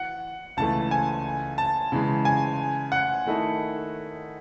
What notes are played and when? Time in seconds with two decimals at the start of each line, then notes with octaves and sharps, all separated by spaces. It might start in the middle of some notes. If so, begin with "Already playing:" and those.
Already playing: E3 F#4 F#5
0.57 C#2 C#3 E3 A3 A5
0.91 G#5
1.58 A5
1.92 C#3 E3 G#3
2.25 G#5
2.92 F#5
3.26 D#3 A3 E4 A4 D#5